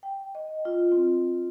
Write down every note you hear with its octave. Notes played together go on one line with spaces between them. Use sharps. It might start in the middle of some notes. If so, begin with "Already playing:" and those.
G5
D#5
F4
C4